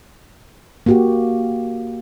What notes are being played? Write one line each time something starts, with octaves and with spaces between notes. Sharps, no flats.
A#3 F#4 G4